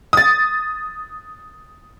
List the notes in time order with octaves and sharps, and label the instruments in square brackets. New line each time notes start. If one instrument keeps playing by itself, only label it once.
[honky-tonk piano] D#6 A6